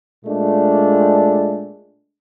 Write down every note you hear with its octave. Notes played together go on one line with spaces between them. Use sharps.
A#2 G#3 A3 D4